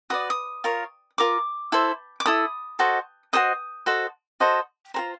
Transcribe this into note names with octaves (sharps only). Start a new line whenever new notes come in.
F#4 B4 D5 D#6
D#6
F4 A#4 C#5
F4 A#4 D6
E4 A4 C5
D6
E4 A4 D#6
F#4 A4 C5 D#5
F#4 A4 C5 D#5 D#6
F#4 A4 C5 D#5
F#4 A4 C5 D#5
F4 G#4 C5 A#5